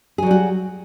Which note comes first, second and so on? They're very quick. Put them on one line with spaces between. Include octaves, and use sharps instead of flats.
G#4 F#3 G3 F#4